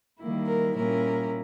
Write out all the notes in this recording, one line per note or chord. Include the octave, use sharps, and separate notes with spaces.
D#3 G3 A#3 E4
A#4
A#2 G3 A#3 C#4 E4 A#4